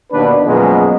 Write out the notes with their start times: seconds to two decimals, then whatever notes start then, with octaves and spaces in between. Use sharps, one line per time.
0.12 D#2 B2 D4 B4
0.44 F#2 B2 F3 G#3 A#3